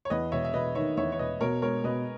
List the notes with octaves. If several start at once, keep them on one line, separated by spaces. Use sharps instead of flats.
C#5
E2 B4 D#5
E1 C#5 E5
E5
E1 B4 D#5
D#3 C#5 E5
E2 C#5 E5
C#5
E1 B4 D#5
B2 A#4 C#5
G#3 A#4 C#5
B2 B4 D#5